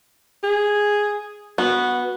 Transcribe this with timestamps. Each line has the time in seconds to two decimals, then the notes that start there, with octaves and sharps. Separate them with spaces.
0.43 G#4
1.58 B3 F#4